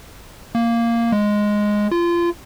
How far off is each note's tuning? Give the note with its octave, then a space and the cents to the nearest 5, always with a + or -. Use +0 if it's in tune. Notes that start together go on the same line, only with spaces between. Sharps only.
A#3 -5
G#3 +0
F4 -25